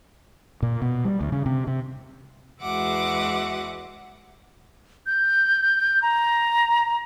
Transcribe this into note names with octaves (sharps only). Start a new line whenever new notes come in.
A#2
B2
G3
D2
C#3
C3
C3
E2 G#3 F#4 E5 F#5 D6
G6
A#5